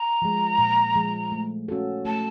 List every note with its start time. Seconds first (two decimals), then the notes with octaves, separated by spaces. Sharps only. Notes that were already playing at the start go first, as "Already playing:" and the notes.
Already playing: A#5
0.22 F3 G#3
0.59 A#2
0.96 F3 G#3
1.32 A3
1.68 C#4 F#4 A4
2.05 A3 A5